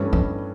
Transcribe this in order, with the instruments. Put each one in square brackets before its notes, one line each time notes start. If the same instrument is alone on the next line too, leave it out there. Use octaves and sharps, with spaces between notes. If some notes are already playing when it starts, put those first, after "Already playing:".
Already playing: [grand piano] G2 E3 A3 C#4 E4
[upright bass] D#4